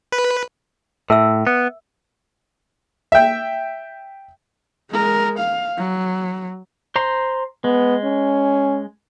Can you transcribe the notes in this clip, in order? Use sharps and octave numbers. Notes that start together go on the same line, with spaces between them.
B4
A2 A#4 E5 E6
B3
E5 G5
G#3 A#4
F5
F#3
C5 A#5 C6
G#3 B3
C#4